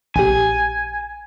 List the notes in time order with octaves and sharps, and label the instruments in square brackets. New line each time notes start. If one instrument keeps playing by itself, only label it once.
[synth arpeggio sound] A#1 G4 [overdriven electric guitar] G#5